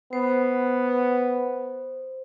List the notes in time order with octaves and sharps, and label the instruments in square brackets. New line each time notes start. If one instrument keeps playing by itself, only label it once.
[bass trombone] B3 [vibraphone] C5